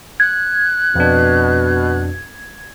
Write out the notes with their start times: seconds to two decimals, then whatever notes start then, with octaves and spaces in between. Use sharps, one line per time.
0.20 F#6 G#6
0.96 F2 B2 D4